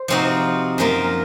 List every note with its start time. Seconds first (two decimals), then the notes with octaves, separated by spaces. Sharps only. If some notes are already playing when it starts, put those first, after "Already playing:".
Already playing: C5
0.08 C3 F3 C4 D#4 F#4
0.78 F#2 F3 A#3 F4